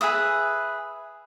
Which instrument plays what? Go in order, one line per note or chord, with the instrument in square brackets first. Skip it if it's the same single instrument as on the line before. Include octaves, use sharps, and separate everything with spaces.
[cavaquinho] G#4 B4 E5 D#6